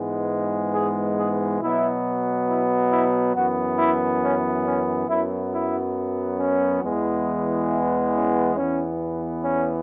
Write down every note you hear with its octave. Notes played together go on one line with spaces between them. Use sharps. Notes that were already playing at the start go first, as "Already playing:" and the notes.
Already playing: G#2 E3 G#3 B3
G#4
G#4
B2 F#3 B3 E4
E4
E4
F#2 E3 B3 F#4
E4
C#4
C#4
F#2 F#3 B3 E4
E4
C#4
E2 E3 G#3 B3
E4
C#4
E2 E3 B3 C#4
C#4